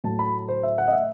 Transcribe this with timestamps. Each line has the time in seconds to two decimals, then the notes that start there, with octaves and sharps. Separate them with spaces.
0.04 A2 F#3 A5
0.19 B5
0.48 C5
0.63 E5
0.78 F#5
0.88 D#5
0.92 E5